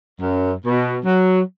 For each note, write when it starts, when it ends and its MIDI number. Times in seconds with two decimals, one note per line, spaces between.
0.20 0.53 42
0.66 0.99 47
1.05 1.40 54